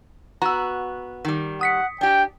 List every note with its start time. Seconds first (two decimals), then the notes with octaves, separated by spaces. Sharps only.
0.42 B3 F#4 A#5 E6
1.25 D#3 G3
1.61 F#5 D#6 B6 C#7
2.01 D4 G4 G5